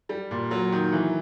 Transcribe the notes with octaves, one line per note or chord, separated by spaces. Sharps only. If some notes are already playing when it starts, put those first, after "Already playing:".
G3
A#2
F#3
D#3
E3